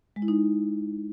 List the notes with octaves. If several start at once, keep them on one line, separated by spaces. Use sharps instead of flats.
G#3
E4
D#4